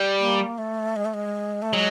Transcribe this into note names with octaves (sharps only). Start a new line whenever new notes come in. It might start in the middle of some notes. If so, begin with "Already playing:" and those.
Already playing: G3
A#3
A3
G#3
A3
G#3
A3
F#3 G#3